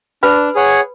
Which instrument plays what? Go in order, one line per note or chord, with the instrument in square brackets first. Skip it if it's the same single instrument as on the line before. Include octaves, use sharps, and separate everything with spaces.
[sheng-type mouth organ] D4 [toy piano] B4 B5
[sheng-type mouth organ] G#4 C#5 F#5